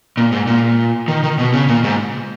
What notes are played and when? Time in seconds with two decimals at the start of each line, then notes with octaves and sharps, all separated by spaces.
0.17 A#2
0.32 G#2
0.47 A#2
1.08 D#3
1.23 D#3
1.39 B2
1.53 C#3
1.68 A#2
1.84 G#2